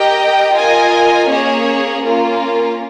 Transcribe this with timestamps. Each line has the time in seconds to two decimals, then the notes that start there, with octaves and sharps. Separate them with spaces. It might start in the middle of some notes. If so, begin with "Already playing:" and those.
Already playing: G4 A#4 D#5 G5
0.54 F4 A#4 D#5 G#5
1.29 A#3 C#4 G#4 C#5
2.03 A#3 C#4 F4 A#4